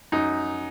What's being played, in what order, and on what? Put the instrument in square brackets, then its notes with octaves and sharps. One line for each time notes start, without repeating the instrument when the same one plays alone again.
[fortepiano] F#2 D#4